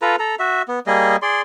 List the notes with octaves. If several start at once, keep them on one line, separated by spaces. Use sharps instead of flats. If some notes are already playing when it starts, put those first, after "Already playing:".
F4 A4 B4 A#5
A4 A#5
F#4 E5
B3
G3 A#3 G#4 D#5
G#4 D5 C6